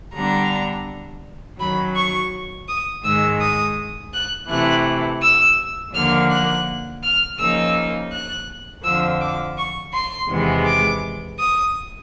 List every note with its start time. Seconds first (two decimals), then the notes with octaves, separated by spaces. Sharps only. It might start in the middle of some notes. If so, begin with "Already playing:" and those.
0.14 D3 G3 B3 D4 A#5
1.60 F#2 D#3 F#3 B5
1.96 C#6
2.68 D#6
3.04 G#2 D#3 G#3 E6
3.41 D#6
4.13 F#6
4.50 C3 E3 A3 F#6
5.22 E6
5.94 D#2 D3 F3 A#3 F6
6.31 F#6
7.03 F6
7.39 C#3 F3 A#3 D#4 E6
8.12 F#6
8.84 F2 D3 F3 E6
9.21 D6
9.57 C#6
9.93 C6
10.30 E2 C3 D#3 G#3 B3
10.65 D6
11.39 D#6